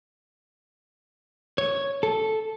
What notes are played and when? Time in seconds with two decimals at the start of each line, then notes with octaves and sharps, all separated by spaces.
1.58 C#5
2.03 A4